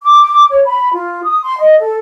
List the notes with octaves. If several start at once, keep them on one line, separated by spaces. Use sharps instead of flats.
D6
C#5
B5
F4
D#6
C6
D#5
A4